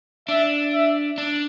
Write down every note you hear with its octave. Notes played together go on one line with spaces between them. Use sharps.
D4 E5
E5
D4